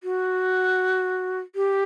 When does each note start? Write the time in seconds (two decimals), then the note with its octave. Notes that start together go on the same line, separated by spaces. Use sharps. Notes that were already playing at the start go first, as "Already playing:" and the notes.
0.03 F#4
1.55 G4